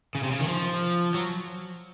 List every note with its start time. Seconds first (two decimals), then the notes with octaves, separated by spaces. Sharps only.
0.15 C#3
0.23 C3
0.31 C#3
0.40 D#3
0.48 F3
1.14 F#3